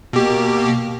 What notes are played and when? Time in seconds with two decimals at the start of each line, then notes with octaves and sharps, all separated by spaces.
0.13 B2 A#3 G4